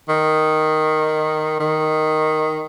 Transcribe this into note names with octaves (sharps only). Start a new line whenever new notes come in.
D#3
D#3